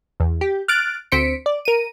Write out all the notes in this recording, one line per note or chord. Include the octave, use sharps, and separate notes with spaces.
E2
G4
F6 F#6 A6 D7
D2 C4 C5 B6 C#7 D7
D5
A#4 D#7